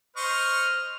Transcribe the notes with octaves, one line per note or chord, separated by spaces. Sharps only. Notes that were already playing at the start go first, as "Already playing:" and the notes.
C5 D#5 C#6 F6